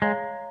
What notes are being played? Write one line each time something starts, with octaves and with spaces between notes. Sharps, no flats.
G#3 C#5 F5 A#5